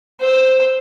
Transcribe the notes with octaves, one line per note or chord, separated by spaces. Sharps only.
C5 E6